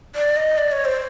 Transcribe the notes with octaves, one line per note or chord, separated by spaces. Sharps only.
D5
D#5
D5
C#5
C5